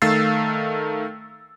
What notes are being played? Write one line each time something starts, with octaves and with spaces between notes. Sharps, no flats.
D#3 A3 F5 E6 A6 C7